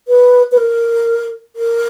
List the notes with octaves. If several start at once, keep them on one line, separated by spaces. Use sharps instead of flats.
B4
B4
A#4
A#4